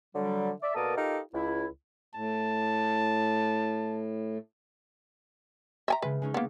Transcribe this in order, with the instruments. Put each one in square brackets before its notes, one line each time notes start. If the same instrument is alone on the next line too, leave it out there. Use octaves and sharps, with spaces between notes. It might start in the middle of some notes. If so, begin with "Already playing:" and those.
[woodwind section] D3 F#3 G3
D5 E5
B2 A#3 A4 A#4 D5 D#6
D#4 F4 G4 A4 A#4
C#2 E4
[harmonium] A2 [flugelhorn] A5
[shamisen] E5 G#5 A#5
[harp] C#3 G#3 [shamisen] B4
[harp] G#3 C#4 D#4
[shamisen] A#3 B3